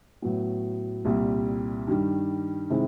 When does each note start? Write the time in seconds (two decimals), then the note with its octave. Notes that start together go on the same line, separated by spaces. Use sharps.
0.22 A2 F#3 B3
1.05 C2 A#2 G3
1.88 G2 D#3 G3
2.70 C3 D#3 G#3 C4 E4